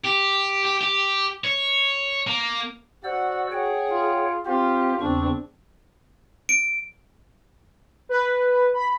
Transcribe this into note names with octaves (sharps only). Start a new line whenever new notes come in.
G4
G4
G4
C#5
A#3
F#4 C5 D5 F#5 E6
G#4 C#5 F#5 G5
F4
C4 F4 G4 C5
E2 C#3 C4 D4 C#6
D7
B4
B5